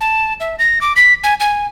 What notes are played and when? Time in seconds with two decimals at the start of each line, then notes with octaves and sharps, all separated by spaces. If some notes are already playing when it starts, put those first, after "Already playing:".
0.01 A5
0.40 E5
0.59 A#6
0.81 D6
0.96 B6
1.24 G#5
1.40 G#5